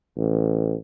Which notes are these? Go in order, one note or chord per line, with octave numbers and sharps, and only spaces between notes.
A1